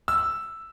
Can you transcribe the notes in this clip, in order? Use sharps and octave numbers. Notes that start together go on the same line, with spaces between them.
E6